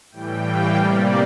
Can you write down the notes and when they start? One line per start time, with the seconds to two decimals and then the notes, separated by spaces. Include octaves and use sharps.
0.11 A2 E3 G3 G5
0.43 F5
0.75 C3 G3 A#3 D5